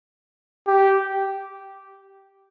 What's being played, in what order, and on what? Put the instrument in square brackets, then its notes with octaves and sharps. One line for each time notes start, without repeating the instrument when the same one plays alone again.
[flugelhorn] G4